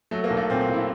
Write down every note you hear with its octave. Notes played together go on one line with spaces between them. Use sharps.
F#3 A3
A#3
B1
A3
A#2 C4
C4
B1
E4